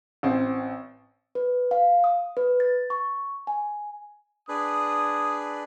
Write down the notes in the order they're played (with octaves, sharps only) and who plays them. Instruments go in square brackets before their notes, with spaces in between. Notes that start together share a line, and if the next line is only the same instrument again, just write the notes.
[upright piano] A1 C4
[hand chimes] B4
F5
D#6
B4
A6
C#6
G#5
[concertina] D4 G#4 B4 [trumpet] D#6